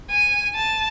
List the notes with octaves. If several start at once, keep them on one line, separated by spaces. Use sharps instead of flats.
G#5
A5